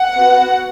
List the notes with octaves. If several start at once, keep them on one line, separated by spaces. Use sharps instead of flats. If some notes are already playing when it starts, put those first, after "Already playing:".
Already playing: F#5
B3 F#4